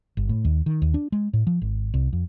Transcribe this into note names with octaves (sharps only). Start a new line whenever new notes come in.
G1
A2
D#2
D#3
D#2
D4
G#3
A2
F3
G#1
C2
F2